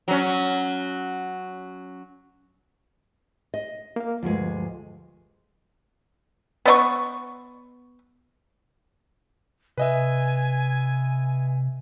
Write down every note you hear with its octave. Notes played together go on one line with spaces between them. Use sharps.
F#3 C#4
D#5
A#3 F5
D2 G2 F3 G#3
B3 D#5 C#6
C3 B4 D#5 E5 G#5